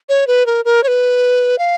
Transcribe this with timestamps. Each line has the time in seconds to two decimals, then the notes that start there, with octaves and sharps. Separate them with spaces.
0.09 C#5
0.27 B4
0.46 A#4
0.65 A#4
0.83 C#5
0.88 B4
1.59 F5